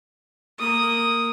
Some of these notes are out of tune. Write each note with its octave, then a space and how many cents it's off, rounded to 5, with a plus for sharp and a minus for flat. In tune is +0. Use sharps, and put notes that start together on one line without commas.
A#3 -10 D#6 +0